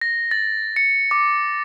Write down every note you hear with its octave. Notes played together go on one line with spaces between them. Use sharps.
A#6
A6
C#7
D6